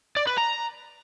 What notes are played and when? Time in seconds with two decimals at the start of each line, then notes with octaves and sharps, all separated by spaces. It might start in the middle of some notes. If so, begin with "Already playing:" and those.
0.17 D5
0.27 B4
0.38 A#5